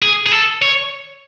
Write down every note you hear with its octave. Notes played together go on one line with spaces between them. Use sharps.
G#4
G#4
A4
C#5